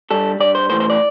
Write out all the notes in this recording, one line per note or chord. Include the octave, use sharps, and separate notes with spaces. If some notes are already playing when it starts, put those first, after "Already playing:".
G2 G3 A4
G2 G3 D5
C5
A2 E3 A3 C5
C5
D5